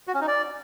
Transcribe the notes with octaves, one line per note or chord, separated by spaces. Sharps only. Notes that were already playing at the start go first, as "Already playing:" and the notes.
F#4
C#4
D#4
D5